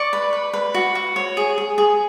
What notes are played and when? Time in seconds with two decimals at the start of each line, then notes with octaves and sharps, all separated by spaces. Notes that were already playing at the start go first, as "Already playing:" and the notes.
Already playing: D5 C#6
0.13 B4
0.33 B4
0.53 B4
0.74 F#4
0.95 F#4
1.16 C#5
1.37 G#4
1.58 G#4
1.78 G#4